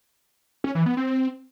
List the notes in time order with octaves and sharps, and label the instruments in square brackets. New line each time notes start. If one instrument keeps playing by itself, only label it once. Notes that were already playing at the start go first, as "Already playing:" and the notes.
[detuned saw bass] C#4
E3
B3
C4